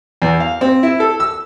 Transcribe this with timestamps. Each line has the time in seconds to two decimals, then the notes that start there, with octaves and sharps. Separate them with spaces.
0.22 E2
0.40 F5
0.61 C4
0.83 E4
1.00 A4
1.20 E6